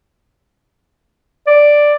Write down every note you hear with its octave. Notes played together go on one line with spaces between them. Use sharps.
D5